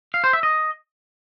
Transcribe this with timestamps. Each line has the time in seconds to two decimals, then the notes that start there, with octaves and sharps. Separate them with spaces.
0.14 F5
0.24 C5
0.33 E5
0.43 D#5